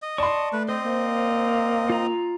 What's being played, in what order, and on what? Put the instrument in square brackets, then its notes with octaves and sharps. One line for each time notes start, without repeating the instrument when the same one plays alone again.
[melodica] D#5
[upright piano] D5 C6 [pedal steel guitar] A5 C#6
[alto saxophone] A3 [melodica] B4
[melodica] C4 D#5 [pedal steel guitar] C5
[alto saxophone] A#3
[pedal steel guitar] F4 A#5